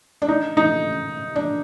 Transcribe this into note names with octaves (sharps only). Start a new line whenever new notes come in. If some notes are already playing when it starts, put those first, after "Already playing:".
D4
D#4
D#4
D4